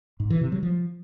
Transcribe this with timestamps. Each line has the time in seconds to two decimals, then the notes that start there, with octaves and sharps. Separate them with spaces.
0.20 G#2
0.30 E3
0.41 C3
0.52 F#3
0.63 F3